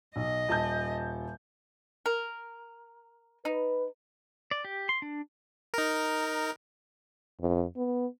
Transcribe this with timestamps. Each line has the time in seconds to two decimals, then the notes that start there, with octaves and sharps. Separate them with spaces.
0.16 B1 D#5
0.48 D#1 A5 G6
2.06 A#4
3.45 D#4 B4
4.51 D5
4.65 G4
4.89 C6
5.02 D4
5.74 D#4 A#4
7.41 F2
7.76 B3